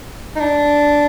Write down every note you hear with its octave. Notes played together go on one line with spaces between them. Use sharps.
D#4
D4